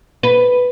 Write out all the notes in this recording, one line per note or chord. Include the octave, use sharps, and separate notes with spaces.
B4